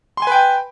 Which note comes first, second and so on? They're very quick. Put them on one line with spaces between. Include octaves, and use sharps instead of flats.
C6 G#5 B4 G5